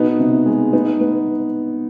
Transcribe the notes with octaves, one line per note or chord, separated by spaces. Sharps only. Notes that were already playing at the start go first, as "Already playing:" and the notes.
Already playing: B2 B3 D#4
C3
G#3
B3 D#4
B3